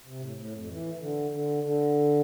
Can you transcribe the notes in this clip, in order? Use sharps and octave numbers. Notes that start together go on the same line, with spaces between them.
C3
A2
A2
F2
E3
E3
D3
D3
D3